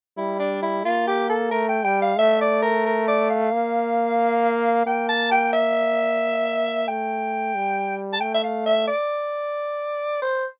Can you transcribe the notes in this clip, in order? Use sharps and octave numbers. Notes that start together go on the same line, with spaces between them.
G3 E4
D4
E4
A#3 F4
G4
A4
A3 A#4
G5
G3 G5
F5
A3 E5
D5
A#4
A#4
D5
F5
A#3
A#3 G5
A5
G5
E5
A3 G5
G3
A5
A3 G5
E5
F5
E5
D5
C5